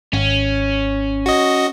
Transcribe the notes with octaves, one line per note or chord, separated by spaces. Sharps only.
G#1 C#4
F#4 D#5